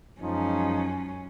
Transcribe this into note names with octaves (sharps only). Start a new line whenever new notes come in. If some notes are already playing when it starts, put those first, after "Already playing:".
F#2 F3 G#3 C#4 D#4